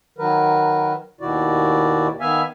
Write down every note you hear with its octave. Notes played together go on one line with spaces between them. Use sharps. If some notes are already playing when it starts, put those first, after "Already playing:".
D#3 F#3 A#4 B4
D#2 B2 D#3 E4 F#4 D5
D#3 B3 E5 F5 G#5